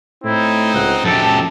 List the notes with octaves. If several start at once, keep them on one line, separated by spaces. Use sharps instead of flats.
A2 C4 D#4 E4
C#2 F#5
C#2 F#2 G4 A4 A5